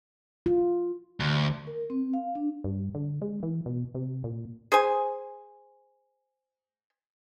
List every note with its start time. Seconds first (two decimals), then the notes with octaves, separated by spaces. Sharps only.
0.46 F4
1.20 D2
1.67 A#4
1.90 C4
2.13 F5
2.35 D4
2.64 G2
2.95 D3
3.22 G#3
3.43 E3
3.66 B2
3.94 C3
4.24 A#2
4.72 G#4 C5 G#5